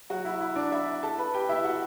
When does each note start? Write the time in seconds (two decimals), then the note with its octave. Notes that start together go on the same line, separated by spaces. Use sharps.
0.10 F#3 F#4
0.25 E4
0.41 E4
0.56 D4 D5
0.71 E4 E5
1.03 A4 A5
1.18 B4 B5
1.34 G4 G5
1.49 E4 E5
1.64 F#4 F#5